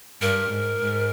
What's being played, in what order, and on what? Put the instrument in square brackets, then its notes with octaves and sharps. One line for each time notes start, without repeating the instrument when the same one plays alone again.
[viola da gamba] G2 [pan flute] A#4
[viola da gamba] G#2
G#2